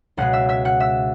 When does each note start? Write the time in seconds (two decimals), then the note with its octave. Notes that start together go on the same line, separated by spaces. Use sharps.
0.17 C#2 B2 G#3 F#5 F#6
0.33 E5 E6
0.49 E5 E6
0.65 F#5 F#6
0.80 E5 E6